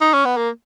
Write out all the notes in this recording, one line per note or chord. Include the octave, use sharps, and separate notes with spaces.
D#4
C#4
B3
A#3